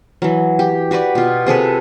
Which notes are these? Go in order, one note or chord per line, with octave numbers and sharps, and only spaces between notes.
E3 F#3
G4
F#4 G4 B4 D5
B2 F4
C3 G#4 A4 B4